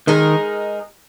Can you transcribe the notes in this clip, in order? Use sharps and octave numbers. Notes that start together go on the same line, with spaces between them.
D#3 G#3 D#4 A#4